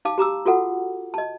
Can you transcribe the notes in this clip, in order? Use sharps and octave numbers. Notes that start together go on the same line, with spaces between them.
D#4 F5 A5 D6
G4 A#5 D6 E6
F4 F#4 A4 F#5
D#5 A5